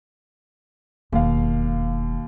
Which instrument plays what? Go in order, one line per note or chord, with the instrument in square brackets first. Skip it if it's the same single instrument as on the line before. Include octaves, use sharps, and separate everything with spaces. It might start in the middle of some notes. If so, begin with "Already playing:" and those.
[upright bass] E1 [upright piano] D#2 F5